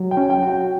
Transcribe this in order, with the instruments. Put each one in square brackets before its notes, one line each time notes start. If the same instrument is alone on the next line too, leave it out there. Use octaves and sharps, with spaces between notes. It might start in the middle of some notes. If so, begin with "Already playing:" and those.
Already playing: [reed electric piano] F#3
[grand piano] G5
[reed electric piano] C#4
[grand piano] G5
[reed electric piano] F#4
[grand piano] G5